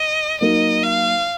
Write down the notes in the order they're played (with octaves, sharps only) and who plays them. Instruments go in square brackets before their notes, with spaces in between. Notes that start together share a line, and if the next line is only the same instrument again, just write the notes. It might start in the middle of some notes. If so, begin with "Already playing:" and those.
Already playing: [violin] D#5
[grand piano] F#3 A#3 D#4 A#4 [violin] D#5
[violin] F5